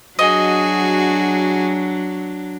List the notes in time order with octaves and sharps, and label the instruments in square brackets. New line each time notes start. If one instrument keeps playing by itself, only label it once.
[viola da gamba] F#3 D4 [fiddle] F#4 G#4 [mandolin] D#5